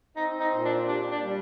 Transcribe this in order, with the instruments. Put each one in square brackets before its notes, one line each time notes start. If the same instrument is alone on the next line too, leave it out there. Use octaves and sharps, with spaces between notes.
[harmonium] C4 [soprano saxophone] D#4
[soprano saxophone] D#4
[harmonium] A#2
[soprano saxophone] D4
[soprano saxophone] D4 [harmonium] G4
[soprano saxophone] D4
[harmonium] G3